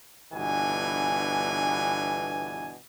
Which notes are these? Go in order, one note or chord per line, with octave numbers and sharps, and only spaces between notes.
G1 B2 E3 D4 G#5